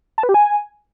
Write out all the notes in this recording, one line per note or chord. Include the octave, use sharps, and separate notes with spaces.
A5
B4
G4
G#5